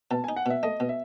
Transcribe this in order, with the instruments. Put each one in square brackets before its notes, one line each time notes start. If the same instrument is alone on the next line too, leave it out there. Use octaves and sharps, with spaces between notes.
[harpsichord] B2 [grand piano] A5
[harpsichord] D#4 [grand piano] G#5
[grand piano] F#5
[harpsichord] B2 [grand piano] E5
[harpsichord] A3 [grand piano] D#5
[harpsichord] B2
[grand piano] E5